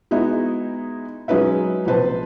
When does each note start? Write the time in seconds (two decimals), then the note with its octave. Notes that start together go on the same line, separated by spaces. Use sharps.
0.11 G#3 B3 D#4 E4 F#4
1.28 F#3 G#3 C#4 D#4 B4 E5
1.86 A#1 C3 B4 C5 A5